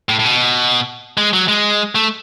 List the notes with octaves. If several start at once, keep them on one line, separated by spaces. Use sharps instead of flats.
A2
A2
B2
G#3
F#3
G#3
A3